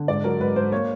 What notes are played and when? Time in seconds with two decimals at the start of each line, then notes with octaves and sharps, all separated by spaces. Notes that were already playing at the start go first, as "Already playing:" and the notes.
Already playing: D3
0.08 G#2 D5
0.24 F#3 A#4
0.40 G#2 B4
0.56 G#2 C5
0.72 A#3 C#5